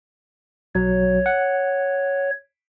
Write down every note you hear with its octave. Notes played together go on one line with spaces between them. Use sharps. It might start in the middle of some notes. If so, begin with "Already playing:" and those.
B1 F#3 C#5
F#5